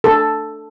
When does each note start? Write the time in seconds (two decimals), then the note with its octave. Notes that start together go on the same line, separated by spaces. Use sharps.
0.04 A4